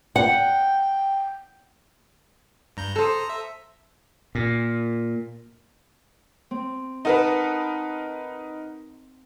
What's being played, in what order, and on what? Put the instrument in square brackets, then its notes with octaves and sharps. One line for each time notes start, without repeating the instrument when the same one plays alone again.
[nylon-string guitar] F#5 [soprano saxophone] G5
[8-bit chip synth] G2 A#5 G6
[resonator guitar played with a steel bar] A4 C5 [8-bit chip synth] A#5 D#6
[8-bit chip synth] E5
[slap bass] A#2
[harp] C4
[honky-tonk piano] D#4 A#4 B4 [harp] F#5 A5 D#6